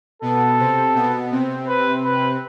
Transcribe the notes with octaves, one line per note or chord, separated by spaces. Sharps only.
B2 B3 A4
C3 C4
B2 B3
C3 C4
B4
B4